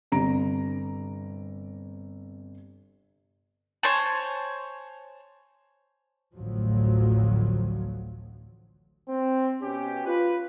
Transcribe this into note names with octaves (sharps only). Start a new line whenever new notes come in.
G1 C3 A#5 D7
C5 C#5 G#5 A5
A1 D2 A2 F3 F#3
C4
B2 C#4 G4
F4 B4